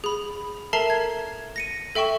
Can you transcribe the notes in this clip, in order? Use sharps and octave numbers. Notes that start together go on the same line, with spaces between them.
G#4 B5
A4 A#4 E5 A5 A#5 C7
G#6
A#6 C#7 D#7
A4 E5 G5 C#6 E7